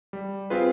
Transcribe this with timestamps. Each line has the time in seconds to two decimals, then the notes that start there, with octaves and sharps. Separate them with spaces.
0.13 G3
0.50 C4 F4 G#4 B4